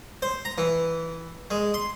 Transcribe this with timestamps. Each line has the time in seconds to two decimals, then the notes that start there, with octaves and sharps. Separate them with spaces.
0.22 C5
0.45 A#5
0.58 E3
1.50 G#3
1.74 C6